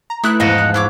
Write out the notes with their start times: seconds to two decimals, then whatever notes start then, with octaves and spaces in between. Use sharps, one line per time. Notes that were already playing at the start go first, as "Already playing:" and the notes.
0.10 A#5
0.24 A3 D#4 E4 B4 F#6
0.40 E2 G#2 F3 D#5 F#5
0.58 F#6
0.74 E4 C#5 D6